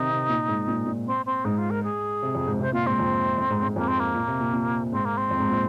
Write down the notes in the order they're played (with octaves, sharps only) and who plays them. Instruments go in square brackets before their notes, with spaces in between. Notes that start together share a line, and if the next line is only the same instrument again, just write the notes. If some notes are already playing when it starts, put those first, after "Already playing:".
Already playing: [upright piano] C3 D#3 [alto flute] D#4
[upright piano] C3
A#2
G#2
A#2
A#2
[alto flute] C4
C4
[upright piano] G#2 [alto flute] D#4
[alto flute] F4
A#4
G#4
[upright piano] C3
F2
G#2
[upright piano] C3 [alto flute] C5
[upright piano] A#2 [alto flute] F4
[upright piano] G#2 [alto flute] C4
[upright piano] F2
F2
G#2
G#2
[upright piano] F2 [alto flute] A#3
[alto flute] C4
A#3
[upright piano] A#2
C3
A#2
A#2
[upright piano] G#2 [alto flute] C4
[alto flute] A#3
C4
[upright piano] F2
G#2
A#2